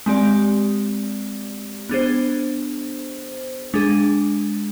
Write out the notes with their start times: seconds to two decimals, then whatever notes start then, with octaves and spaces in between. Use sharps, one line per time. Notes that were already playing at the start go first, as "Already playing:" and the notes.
0.06 G#3 C4 G4 D5
1.89 B3 D4 G#4 C5
3.74 G#3 D4 G#4